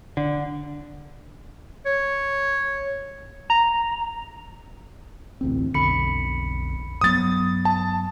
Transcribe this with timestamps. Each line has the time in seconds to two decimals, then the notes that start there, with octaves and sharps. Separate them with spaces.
0.17 D3
1.86 C#5
3.50 A#5
5.41 A1 D2 C4
5.74 B1 F2 D3 B5 C#7
7.01 G2 F#3 B3 D#6 A6
7.65 A5